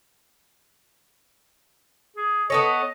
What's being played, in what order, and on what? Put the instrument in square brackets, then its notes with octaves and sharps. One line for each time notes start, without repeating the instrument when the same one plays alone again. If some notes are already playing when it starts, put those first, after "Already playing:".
[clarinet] G#4
[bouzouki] B3 A4 C#5 [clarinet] D#5